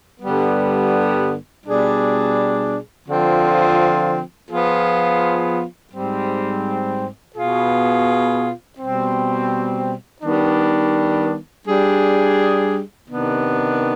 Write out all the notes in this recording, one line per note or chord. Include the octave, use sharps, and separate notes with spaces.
G2 D3 G3 B3
B2 G3 D4 G#4
D3 F3 C4 F4
F3 B3 F4 G#4
G#2 G3 C4
B2 B3 F4 G#4
B2 G3 C4
D#3 G3 B3 D4
G3 D4 G#4
C3 D#3 B3 D4